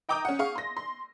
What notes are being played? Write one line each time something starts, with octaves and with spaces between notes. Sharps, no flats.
D#5 G5 A#5 D6 D#6 G6
C#4 F#5
G#4 F5 C#6
C6 A#6
C6